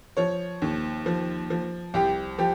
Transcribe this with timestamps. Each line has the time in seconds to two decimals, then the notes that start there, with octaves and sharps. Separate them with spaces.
0.17 F3 C#5
0.62 D#2
1.06 F3
1.50 F3
1.94 C2 G4
2.39 F3 G4